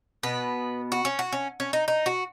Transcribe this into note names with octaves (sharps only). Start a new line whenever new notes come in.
B2 B3 B4
F#4
C#4
F#4
C#4
C#4
D#4
D#4
F#4